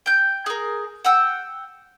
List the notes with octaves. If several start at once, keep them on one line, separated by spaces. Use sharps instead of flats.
G5 G6
G#4 A#4
F#5 G5 E6